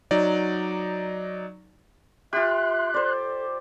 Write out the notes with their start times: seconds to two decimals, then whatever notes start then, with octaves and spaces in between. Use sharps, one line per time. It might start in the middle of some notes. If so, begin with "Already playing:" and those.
0.11 F#3 D#4 D5
2.33 F4 G4 E5 C6 F#6
2.94 A4 C5 D5